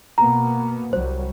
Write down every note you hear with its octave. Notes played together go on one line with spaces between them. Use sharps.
B2 A#3 B3 A#5
C2 F#3 G3 C5